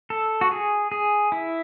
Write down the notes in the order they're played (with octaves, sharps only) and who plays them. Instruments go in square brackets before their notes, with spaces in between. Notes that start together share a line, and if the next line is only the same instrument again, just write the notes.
[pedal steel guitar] A4
F#4
G#4
G#4
E4